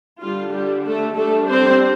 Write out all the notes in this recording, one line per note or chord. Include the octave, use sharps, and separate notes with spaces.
D3 G3 D4 F4
G3 G4
A3 A4
G3 A3 D4 A4
C4 C5